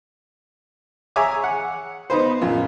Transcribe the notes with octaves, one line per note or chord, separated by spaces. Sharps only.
G#4 C#5 E5 G#5 A#5 D6
F#5
B3 D#4 B4 C5
A#1 F#2 F4